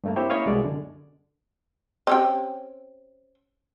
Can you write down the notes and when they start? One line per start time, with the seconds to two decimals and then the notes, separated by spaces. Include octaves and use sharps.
0.04 G2 A3 A#3
0.16 C4 E4 G4 C5 C#5
0.30 A#3 C#4 E4 C#5 D#5 F5
0.46 C2 B2 G#3 D5
0.64 F#2 D3
2.07 C4 C#4 G4